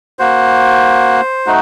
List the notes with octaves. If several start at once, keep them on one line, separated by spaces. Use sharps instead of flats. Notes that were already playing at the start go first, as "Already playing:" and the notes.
A#3 F#4 C5
A3 D#4 F#4